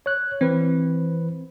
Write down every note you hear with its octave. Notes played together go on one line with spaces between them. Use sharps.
C#5 F#6
E3 C4 B4